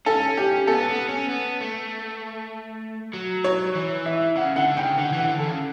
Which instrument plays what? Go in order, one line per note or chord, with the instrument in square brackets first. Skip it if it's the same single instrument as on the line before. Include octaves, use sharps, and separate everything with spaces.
[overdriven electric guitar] C#4 [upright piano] A4
[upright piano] G4
[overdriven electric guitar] B3 [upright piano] A4
[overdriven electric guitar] B3
C#4
B3
A3
F#3
[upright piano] C#5
[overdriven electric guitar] E3
[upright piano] E5
[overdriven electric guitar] C#3 [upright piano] F#5
[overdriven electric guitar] D3 [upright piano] F#5
[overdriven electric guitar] C#3 [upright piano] G5
[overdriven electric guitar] D3 [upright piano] F#5
[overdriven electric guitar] E3
[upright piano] F#5
[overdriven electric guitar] D3
[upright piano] A4
[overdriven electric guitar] C#3